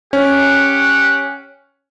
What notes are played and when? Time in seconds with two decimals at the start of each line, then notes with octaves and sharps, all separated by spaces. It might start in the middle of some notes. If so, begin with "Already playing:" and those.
0.13 C#4 G4 F#5